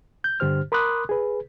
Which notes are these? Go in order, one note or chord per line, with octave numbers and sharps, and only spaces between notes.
G6
G2 D3 G4 C5 F6
A#4 B5 C6 D6 D#6 F#6
G#4 B4